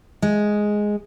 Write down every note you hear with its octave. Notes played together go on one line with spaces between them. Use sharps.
G#3